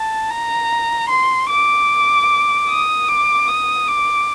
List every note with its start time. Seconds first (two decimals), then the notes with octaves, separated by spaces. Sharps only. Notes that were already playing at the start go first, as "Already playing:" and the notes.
Already playing: A5
0.30 A#5
1.09 C6
1.50 D6
2.69 D#6
3.09 D6
3.48 D#6
3.88 D6